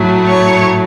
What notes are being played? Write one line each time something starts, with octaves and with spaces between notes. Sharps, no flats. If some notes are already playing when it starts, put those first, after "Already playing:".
Already playing: A2 F#3 A3
C#5